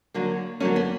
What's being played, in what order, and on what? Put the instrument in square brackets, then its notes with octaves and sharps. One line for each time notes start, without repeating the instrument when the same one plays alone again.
[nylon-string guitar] D3 F#3 A#3
D3 F#3 A#3 C#4
B3